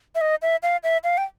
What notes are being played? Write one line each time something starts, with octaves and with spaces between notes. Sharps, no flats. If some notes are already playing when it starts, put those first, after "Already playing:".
E5
D#5
E5
F5
E5
F5
G5